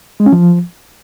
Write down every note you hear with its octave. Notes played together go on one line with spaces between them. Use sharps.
G#3
C#4
F3